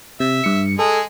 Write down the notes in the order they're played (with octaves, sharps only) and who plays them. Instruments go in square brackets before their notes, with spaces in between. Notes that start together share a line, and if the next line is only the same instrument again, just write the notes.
[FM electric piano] C3 [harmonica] E5
[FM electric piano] G2 C#7
[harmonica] G#3 G#4 [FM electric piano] A4